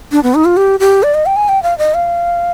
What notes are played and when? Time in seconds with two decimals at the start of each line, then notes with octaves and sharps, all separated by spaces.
0.12 D4
0.23 B3
0.35 D#4
0.45 F4
0.57 G4
0.80 G4
1.03 D5
1.14 D#5
1.26 G5
1.36 G#5
1.49 G5
1.63 F5
1.78 D#5
1.94 F5